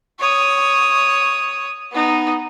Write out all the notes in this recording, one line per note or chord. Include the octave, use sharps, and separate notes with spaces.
C#5 D#6
B3 D#4